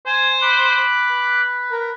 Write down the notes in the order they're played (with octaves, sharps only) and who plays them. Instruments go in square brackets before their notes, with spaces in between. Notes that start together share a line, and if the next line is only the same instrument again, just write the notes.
[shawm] C5 [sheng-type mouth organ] G#5
[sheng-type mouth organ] B5 D6 F#6
[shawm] B4
[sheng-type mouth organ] A#4